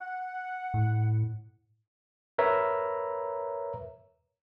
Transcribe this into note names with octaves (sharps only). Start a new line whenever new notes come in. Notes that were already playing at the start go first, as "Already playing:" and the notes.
F#5
A2
A#4 B4 C#5 E5 A#5